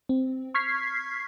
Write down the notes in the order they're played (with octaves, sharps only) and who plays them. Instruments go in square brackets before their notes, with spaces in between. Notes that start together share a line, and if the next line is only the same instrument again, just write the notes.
[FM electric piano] C4
C#6 F6 G#6 B6 C7